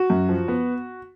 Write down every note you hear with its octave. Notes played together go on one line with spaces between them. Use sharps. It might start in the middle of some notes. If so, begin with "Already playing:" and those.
Already playing: F#4
F#2
F3
B3